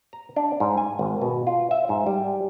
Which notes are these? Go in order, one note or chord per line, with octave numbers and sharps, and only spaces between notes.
A#5
D4
G#2
G#5
G#1
B2
F4
E5
G#2
G3